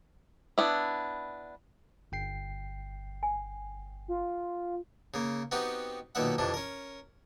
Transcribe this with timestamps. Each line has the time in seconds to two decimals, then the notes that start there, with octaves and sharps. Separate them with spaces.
0.58 B3 D4 E4
2.12 G1 G5 C7
3.23 G#5
4.08 F4
5.14 C#3 A#3
5.52 B3 C4 D#4 F#4 G4
6.15 B1 A#2 D#3 B3 E5 F#5
6.38 F2 C3 E3 D4
6.54 C#4 A#4